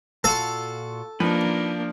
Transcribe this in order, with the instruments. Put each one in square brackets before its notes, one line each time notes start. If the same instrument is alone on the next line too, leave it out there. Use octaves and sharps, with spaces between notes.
[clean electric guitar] A#2 F4 F#4 [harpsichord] A4
[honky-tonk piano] F3 [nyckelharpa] A#3 D4 [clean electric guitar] D#4 B4